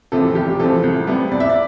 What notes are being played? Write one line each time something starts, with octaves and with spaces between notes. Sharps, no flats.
E2 C3 F3 A4
F1 G4
E2 C3 F3 A4
C2
C3 G3 B3
C2 D5
E5
D5